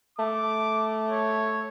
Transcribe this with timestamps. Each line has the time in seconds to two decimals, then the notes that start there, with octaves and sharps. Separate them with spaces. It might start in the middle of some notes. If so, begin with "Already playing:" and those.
0.19 A3 D6
1.08 C#5